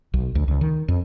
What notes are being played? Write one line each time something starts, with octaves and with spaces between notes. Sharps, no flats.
B1
D2
C#2
D#3
F2